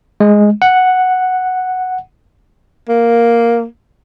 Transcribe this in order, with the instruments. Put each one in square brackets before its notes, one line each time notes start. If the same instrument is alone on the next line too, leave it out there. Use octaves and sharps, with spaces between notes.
[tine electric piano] G#3
F#5
[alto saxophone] A#3